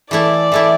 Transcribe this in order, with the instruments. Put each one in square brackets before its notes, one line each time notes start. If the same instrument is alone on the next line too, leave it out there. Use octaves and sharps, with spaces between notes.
[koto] E3 A3 E4 [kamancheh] D5
[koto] E3 A3 E4